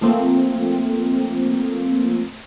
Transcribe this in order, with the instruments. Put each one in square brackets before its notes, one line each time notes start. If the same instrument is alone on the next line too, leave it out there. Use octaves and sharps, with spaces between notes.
[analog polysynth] F3 A3 A#3 C4